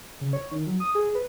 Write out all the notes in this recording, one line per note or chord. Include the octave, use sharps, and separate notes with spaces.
C#3
C#5
D#3
F#3
D#6
G#4
B4